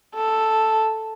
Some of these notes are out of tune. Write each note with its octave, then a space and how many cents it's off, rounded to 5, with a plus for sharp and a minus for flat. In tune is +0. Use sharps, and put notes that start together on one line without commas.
A4 +0